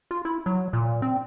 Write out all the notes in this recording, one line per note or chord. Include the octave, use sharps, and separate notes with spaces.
F4
E4
F#3
A#2
C4